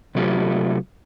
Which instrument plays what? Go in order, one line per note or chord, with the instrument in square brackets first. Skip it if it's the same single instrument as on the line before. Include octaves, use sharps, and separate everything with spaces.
[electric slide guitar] C3 F#3 A3 E4 F4 G4